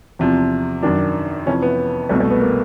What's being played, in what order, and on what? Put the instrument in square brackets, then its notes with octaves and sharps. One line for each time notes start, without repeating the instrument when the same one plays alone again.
[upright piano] E2 C3 F3
F#2 D#3 D4
F2 C3 E3 C#4
B3
C2 B2 A3
A3
B3
A#3